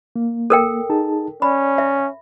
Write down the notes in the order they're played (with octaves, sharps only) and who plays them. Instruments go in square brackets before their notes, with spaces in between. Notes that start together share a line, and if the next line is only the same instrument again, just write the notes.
[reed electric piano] A#3
[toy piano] A4 A#4 G5
[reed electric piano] D#4 G#4 A5
[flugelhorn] C#4 [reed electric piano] D5 [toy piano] B5
[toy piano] E5